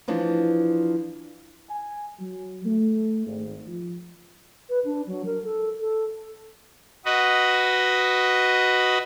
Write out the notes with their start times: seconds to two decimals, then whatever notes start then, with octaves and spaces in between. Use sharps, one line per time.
0.08 E3 F3 D4
1.68 G#5
2.19 F#3
2.64 A3
3.26 G#1
3.65 F3
4.69 B4
4.85 D4
5.07 F#3
5.26 A#4
5.44 A4
5.80 A4
7.05 F#4 B4 D#5